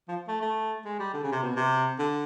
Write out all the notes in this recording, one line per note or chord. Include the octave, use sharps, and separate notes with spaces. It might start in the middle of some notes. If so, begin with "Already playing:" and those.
F3
A3
A3
G#3
G3
D3
C#3
C3
B2
C3
D3